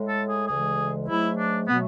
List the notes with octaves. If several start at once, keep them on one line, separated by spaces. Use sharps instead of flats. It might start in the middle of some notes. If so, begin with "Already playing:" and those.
Already playing: A2 G#3
A4
G#4
D2 C#3 E3 G#3 G#4
G#2 F#3 A3 E4
D4
B2 F#3 A3 B3